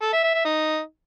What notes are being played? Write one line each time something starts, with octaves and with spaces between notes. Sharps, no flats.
A4
E5
E5
E5
D#4